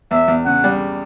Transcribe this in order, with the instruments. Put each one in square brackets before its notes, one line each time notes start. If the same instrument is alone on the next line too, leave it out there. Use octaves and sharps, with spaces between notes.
[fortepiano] E2 [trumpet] E5
[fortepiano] E2
[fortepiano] C#3 [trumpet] F#5
[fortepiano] G3